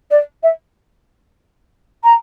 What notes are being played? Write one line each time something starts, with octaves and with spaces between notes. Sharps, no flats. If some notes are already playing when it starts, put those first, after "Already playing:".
D5
E5
A#5